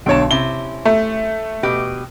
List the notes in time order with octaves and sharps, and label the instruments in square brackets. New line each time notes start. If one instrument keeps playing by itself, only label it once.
[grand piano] B1 D3 C#5 [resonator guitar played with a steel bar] G5 A5
[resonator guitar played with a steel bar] C3 C#4 E4 [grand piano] G7
[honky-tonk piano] A3
[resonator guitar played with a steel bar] B2 G4 B4